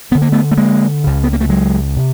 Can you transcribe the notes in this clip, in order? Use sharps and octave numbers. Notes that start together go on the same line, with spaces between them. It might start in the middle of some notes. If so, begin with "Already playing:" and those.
D2 D3 B3
A#3
A3 B3
A3
G#3 A#3
C#2 C#3
B3
A#3
A3
F#3 G#3
C3